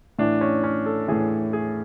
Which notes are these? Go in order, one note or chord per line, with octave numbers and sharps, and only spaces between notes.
A2 E3 D4
C#4
C#4
A4
A2 E3 G#4
G#4